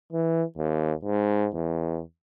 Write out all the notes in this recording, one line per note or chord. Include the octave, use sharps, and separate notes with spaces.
E3
D#2
G#2
E2